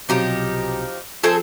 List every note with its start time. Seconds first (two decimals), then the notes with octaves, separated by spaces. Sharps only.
0.09 B1 C3 F3 F#3 D#4 G4
1.23 F3 C4 G#4 A4